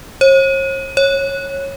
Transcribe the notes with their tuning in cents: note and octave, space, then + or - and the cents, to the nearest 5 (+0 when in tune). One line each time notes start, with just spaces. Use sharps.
C#5 -45
C#5 -15